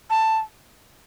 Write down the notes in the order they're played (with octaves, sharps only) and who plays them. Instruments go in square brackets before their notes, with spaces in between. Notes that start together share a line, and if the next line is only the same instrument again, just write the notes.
[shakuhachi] A5